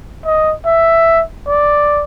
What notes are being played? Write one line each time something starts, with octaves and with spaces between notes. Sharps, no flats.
D#5
E5
D5